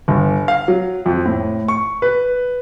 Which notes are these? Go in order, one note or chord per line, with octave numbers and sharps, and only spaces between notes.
G1
F5
F#3
F2
A2
C#6
B4